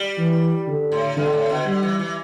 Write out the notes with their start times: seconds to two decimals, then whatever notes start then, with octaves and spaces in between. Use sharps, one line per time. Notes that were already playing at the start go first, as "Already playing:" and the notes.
Already playing: G3
0.18 E3
0.68 D3
0.92 A2
1.17 G2 D3
1.26 B2
1.33 A2
1.49 B2
1.66 D3 G3
1.83 E3
1.99 E3